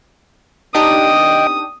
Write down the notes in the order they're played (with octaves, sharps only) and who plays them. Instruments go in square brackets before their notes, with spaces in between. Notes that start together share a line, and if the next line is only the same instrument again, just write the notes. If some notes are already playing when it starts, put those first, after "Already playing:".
[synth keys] D4 D#4 G4 [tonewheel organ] D#5 G5 [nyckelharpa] D#6